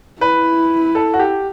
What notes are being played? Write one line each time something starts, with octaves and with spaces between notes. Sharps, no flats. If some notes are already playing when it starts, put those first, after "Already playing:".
E4 B4
A4
F#4
G4